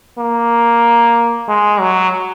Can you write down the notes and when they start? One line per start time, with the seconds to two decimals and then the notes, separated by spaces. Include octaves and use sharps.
0.18 A#3
1.48 G#3
1.80 F#3